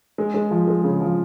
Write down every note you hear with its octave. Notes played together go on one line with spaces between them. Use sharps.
G#3
G#3
F3
G#3
C#3
F3